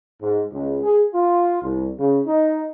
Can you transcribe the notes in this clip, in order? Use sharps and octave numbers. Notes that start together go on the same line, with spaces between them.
G#2
C#2
G#4
F4
C2
C#3
D#4